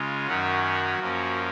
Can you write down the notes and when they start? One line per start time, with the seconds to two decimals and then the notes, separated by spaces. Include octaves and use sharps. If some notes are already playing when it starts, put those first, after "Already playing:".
Already playing: C#3 G#3 F4
0.27 F#2 D#3 F#3 C#4 F#4
0.63 F#4
0.99 F#2 F3 A#3 C#4